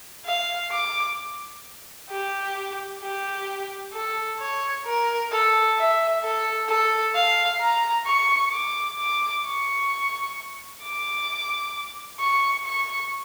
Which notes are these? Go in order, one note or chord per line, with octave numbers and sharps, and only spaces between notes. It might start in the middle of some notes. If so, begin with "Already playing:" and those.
F5
D6
G4
G4
A4
C#5
A#4
A4
E5
A4
A4
F5
A#5
C#6
D6
D6
C#6
D6
C#6
C#6